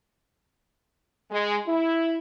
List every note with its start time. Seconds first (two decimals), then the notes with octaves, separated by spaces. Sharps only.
1.31 G#3
1.67 E4